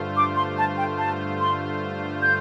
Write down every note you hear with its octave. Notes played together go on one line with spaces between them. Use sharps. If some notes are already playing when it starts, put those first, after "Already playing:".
Already playing: G2 D3 A3 F4 C5
D6
C6
A5
G5
A5
C6
G6